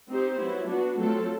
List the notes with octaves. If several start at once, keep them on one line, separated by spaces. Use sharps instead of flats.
C4 D#4 G4 C5
F#3 B3 E4
B3 D4 F#4
F#3 A3 C4 F4 A4